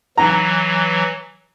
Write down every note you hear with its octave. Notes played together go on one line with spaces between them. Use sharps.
E3 F#3 A#5